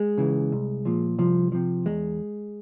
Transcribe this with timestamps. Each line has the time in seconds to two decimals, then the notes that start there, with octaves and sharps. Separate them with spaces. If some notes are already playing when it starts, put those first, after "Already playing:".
Already playing: G#3
0.18 C#3 E3
0.52 C2
0.85 A#2 F3
1.18 C2 F3
1.52 C3 F3
1.86 E2 G#3